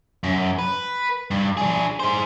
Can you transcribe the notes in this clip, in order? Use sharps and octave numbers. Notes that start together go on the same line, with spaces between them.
F#2
B4
G2
D4 G#4
G#4 C5